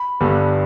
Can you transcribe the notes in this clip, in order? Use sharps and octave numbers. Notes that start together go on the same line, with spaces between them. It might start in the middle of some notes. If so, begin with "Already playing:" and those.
Already playing: B5
G1 G2 D3 G3 B3